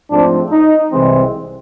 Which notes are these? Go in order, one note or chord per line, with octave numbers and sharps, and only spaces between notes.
G#2 F3 A3 C4 D4
D#4
C2 C3 E3 G#3 C4